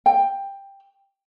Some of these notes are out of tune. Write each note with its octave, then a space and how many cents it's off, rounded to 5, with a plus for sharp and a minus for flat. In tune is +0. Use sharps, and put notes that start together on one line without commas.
G5 +10